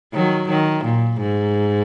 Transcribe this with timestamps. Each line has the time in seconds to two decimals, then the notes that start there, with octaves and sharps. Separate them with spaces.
0.14 D#3 F#3
0.49 D#3
0.84 A#2
1.20 G#2